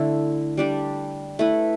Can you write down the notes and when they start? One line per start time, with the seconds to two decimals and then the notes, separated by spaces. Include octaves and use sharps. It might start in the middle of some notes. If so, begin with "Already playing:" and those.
Already playing: D3 A3 E4
0.57 G3 D4 G4
1.39 A3 E4 B4